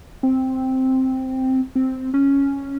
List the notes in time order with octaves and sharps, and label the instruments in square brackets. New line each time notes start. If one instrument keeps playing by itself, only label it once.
[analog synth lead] C4
C4
C#4